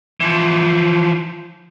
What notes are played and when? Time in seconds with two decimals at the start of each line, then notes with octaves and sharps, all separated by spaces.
0.20 E3 F3